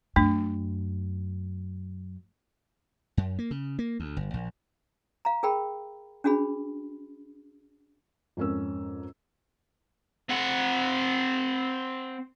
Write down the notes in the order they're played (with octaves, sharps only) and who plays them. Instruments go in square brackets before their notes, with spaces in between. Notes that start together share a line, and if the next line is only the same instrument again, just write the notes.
[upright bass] F#2 [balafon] A3 D4
[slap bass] F#2
A#3
C#3
A#3
D2
G1
A#1
[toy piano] F5 A#5
G#4 A#4 G5 B5
C#4 D4 F#4 G#4 B5
[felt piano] F2 G#2 C#4 A#4 E6
[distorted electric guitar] C4 F#5